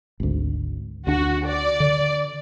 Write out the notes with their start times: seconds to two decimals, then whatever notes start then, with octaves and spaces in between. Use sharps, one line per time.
0.20 G#1 D2
1.07 D2 D4 F#4
1.47 D5
1.80 D3